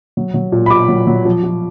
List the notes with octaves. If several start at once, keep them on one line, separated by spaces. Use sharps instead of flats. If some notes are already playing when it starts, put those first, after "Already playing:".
F#3
F#3
A#2
B5
A#2 D6
F#3
F#3
F3
F3